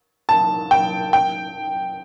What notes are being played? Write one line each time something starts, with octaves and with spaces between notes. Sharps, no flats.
A5
G5
G5